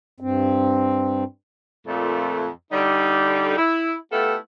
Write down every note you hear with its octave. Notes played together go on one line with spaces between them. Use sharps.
G2 C4
F2 A#2 A3
D3 G3 D#4
E4
A3 B3 E4 F4 G4 A4